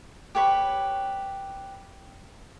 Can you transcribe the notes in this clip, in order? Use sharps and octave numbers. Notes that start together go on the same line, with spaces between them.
G4 B4 C#5 B5